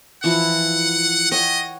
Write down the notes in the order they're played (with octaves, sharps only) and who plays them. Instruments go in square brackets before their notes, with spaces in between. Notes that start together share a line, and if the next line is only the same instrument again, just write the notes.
[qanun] E3 F3 E4 [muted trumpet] F#5
[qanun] C#5 F#5 G5 [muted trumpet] D#5